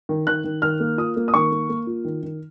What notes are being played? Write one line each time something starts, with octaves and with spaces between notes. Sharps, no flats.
D#3
D#3 F#6
D#3
D#3 F6
A#3
F4 D#6
A#3
D#6
D#3 C#6
A#3
A#3
F4
D#3
D#3